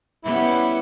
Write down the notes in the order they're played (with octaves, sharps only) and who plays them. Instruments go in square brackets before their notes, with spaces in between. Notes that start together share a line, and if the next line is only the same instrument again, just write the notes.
[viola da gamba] G3 B3 C#4 [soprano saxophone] E4